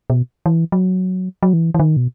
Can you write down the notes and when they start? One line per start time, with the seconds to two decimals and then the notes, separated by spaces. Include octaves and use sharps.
0.10 B2
0.46 E3
0.72 F#3
1.43 F#3
1.53 E3
1.74 E3
1.80 D#3
1.97 B2